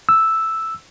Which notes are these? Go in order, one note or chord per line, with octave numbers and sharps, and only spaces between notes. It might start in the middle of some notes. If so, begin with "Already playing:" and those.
E6